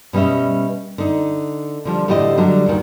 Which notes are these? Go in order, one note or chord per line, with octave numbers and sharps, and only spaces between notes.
B2 G3 C#4 D#5 E5
D3 D#4
D3 F3 G3
A2 D3 E4 G4 C5 D#5
D3 F#3 G3
D#2 A#2 D#3